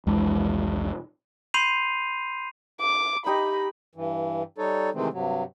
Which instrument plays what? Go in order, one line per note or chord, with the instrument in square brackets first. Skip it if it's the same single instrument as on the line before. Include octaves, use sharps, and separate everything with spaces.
[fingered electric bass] F1 F2 G#3 [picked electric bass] C2 E3 D4
[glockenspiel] B5 C6 G6 C7 D#7 F7
[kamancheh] D6
[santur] D#4 G4 D#5 [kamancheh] B5
[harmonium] G2 E3
G3 D#4 A4 C#5
C3 D#3 E3 G#3 A3 C4
G2 C3 F#3